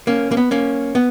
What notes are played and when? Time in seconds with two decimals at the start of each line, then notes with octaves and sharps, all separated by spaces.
0.07 A#3 C#4
0.31 A#3
0.37 B3
0.51 A#3 C#4
0.95 B3